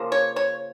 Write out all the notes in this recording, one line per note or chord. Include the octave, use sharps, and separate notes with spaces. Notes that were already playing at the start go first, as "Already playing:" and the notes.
Already playing: C#3 F3 A#3
C#5
C#5